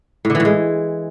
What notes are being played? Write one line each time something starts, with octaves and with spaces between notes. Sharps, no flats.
A2
D3
E3
A2
G#3